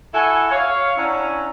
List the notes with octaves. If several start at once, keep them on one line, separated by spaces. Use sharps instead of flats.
E4 F#4 A4 G#5
C#5 F5
C#4 D4 E4 E5 F#5 A#5